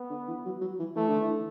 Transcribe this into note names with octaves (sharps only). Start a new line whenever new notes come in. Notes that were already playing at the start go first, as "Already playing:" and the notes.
Already playing: B3
D3
E3
F#3
F#3
E3
E3 A3
D3
E3